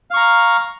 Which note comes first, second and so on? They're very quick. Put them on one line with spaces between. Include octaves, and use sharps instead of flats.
F5 C#6 A#5